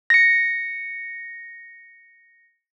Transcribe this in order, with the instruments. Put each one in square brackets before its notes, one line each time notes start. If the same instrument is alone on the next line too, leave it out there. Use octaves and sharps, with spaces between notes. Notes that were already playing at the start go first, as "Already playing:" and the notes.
[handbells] A#6 C#7